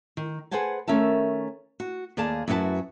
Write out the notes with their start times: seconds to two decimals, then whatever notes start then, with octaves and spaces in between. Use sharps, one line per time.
0.17 D#3
0.51 G#4 B4 C5 F#5 G#5 A5
0.88 D#3 A3 C#4 A#4 E5 A5
1.80 F#4
2.17 D#2 G#4 D5 F5 A5
2.48 F#2 E4 F#4 G4 B4 A5